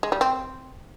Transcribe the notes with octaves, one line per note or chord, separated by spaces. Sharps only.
G#3
G3
C4